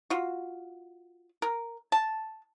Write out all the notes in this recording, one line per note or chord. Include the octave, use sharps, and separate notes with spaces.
F4 F#4
A#4
A5